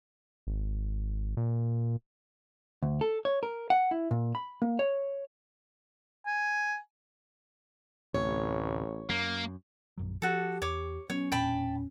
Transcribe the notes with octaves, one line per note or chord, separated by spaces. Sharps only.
G#1
A#2
D2
A4
C#5
A#4
F#5
E4
A#2
B5
A#3
C#5
G#5
A1 D2 A2 C3 C#5
F#2 A#3
A#1 F#2 F#3
F3 F#4 G4 A4
E2 C#5 D6
F#3 B3 C#4 C#5
E1 A#2 D4 G5 A5 B5